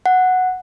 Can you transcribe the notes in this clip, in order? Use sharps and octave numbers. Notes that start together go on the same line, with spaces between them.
F#5